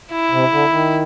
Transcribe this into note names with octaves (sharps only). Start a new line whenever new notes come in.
E4
C3
D3
D#3